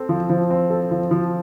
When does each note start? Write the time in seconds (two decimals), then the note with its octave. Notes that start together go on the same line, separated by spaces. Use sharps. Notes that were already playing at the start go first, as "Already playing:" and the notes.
Already playing: C4 A4
0.09 F3
0.30 F3
0.50 C4
0.70 A4
0.91 F3
1.11 F3